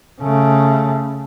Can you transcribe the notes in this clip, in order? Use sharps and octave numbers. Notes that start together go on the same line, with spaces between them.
C#3 A3